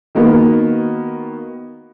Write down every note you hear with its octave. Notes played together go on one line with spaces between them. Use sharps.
D#3 A#3 B3 F#4